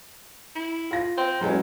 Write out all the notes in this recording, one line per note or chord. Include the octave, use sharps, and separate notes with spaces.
E4
F4 A#6
C4
E2 F#3 G#3 C#4